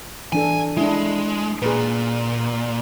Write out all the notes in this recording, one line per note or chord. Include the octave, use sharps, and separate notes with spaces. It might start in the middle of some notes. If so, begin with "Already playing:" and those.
E3 D4 A4 G#5
G#3 D4 E4
A#2 G#4 B4